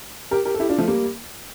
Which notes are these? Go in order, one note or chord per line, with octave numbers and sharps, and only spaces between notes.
G4 A#4
G4 A#4
A4
E4 G4
D4 F4
F3 A3
G3 A#3